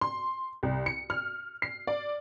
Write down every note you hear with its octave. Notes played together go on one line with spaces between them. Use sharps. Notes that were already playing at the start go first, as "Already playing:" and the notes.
C6
C2
C#7
F6
C7
D5